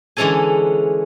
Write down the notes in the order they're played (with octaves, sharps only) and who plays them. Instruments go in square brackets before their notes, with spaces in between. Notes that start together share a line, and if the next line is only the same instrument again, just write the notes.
[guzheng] D3 E3 G#3 C#4 A4 G#5